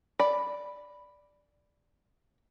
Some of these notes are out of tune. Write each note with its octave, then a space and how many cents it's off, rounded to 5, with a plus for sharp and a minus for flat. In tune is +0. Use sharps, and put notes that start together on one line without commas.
D5 +0 B5 +0